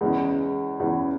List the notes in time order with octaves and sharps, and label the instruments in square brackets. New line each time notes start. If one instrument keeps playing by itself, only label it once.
[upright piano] E2 C#3 E3 G#3
E2 C#3 E3